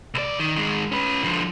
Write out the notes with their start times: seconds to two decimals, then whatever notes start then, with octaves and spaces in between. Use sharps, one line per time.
0.14 C2 D5
0.40 D#3
0.56 D#3 G#3
0.92 C#4 B4
1.23 D3 F3